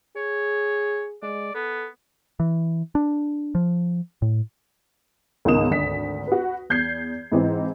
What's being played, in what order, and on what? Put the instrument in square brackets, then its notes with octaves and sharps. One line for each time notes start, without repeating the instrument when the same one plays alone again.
[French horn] G#4 [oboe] C#5
[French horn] G#3 [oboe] D5
[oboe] B3 [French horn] A4
[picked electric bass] E3
D4
F3
A2
[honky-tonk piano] C#2 G#2 B2 D#3 D#6 E7
G#1 D2 B6
F#4 B4
E2 G6 G#6 C7
G#2 E3 C4